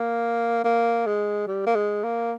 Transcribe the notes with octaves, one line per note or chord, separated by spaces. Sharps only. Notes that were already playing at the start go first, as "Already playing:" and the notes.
Already playing: A#3
A#3
G#3
G3
A#3
G#3
A#3